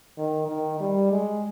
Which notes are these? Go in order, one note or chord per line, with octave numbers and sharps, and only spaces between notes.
D#3
D#3
G3
G#3